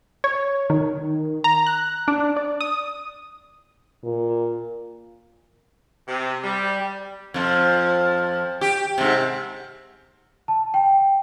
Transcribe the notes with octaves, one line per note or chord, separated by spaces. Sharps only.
C#5
D#3
A#5
F#6
D4
D5
D#6
A#2
C3
G3
F2 F3
G4
G#2 C3
A5
G5